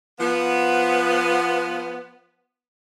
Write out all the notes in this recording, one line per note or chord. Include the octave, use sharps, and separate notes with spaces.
F3 B3